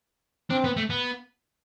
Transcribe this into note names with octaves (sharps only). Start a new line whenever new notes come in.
C4 D4
B3
A3
B3